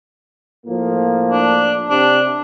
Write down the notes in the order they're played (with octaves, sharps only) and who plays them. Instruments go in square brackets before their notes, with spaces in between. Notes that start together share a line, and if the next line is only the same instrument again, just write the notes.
[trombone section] A2 F3 A#3
[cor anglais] D4
[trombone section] C3 C4 [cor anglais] D4